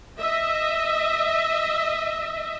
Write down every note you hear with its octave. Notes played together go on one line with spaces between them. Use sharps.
D#5 E5